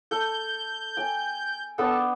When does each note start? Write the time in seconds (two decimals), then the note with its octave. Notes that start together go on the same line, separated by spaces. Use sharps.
0.11 A4 G6
0.97 G5 G#5
1.78 B3 D4 A4 G5